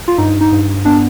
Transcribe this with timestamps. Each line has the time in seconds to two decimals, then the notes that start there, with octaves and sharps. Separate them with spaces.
0.08 F4
0.18 G2 D#4
0.41 D#4
0.52 G2
0.85 B3 D4